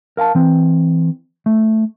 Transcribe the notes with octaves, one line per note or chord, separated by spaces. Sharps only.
A#4 F5 G5 A5
E3 C4
A3